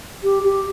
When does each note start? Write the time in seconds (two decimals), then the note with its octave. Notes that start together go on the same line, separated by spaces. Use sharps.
0.24 G4
0.43 G4